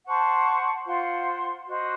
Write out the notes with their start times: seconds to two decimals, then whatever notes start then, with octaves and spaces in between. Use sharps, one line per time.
0.06 C5 F#5 A5 C#6
0.85 F4 C5 F#5 C6
1.66 F#4 C5 D#5